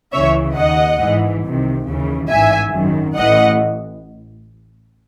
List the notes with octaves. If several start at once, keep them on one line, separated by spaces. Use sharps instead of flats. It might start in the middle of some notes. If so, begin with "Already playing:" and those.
C#2 C#3 E3 C#5 E5
D#2 D#3 D#5 F#5
G#1 G#2 E3
C2 C3 D#3
D#2 C#3 E3
A1 G#2 E3 E5 G#5
G#1 F#2 D#3
A1 A2 E3 D#5 F#5